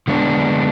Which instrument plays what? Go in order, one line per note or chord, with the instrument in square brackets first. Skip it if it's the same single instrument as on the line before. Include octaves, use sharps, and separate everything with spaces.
[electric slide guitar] D3 G#3 B3 D4